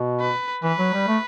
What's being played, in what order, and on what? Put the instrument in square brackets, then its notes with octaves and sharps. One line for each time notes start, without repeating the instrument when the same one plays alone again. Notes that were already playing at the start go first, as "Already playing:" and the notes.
Already playing: [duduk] B2
[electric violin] B4
[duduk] E3 [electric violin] B4
[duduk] F#3
G3
A3